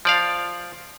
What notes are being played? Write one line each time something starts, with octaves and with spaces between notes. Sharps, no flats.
F3 D5 F5